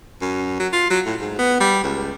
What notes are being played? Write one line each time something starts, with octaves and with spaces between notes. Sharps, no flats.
F#2
F#3
F4
F#3
A2
G#2
B3
G3
C#2